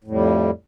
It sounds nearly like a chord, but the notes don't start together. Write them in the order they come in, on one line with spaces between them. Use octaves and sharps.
A2 F2 G3